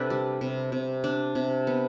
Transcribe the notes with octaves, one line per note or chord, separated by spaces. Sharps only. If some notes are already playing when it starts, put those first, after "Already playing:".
Already playing: C3 D4 G4 A4 B4 D5
G3
C3
C3
D4
C3
B3